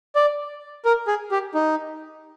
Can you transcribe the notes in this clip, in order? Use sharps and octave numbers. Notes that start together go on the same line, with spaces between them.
D5
A#4
G#4
G4
D#4